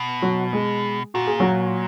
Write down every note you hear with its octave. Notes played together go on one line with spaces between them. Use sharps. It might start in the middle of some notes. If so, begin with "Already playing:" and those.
Already playing: B2
F#3 F#4
G#3 G#4
A#2 F#4
G#4
F#3 F#4